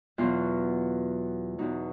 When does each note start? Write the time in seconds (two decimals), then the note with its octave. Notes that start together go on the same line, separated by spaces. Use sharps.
0.18 E2 B2 F#3 F4
1.58 E2 B2 F#3 D#4